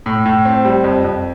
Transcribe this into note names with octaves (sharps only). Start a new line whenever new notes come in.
A2
A2
C4
G3
F2
F2